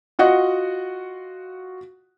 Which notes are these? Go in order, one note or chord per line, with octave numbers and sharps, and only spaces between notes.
F4 F#4 D#5 F#5